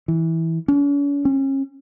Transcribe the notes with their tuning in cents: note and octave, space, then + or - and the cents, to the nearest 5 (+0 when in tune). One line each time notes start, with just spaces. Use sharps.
E3 -15
C#4 +45
C#4 -35